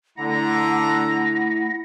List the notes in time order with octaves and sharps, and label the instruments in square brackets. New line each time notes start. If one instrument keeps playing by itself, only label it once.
[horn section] D3 A#5 [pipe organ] A3 E4 F#5 [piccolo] A#6